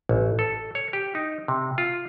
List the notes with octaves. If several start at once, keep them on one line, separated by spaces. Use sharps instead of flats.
A1
A4
C#5
G4
D#4
C3
F4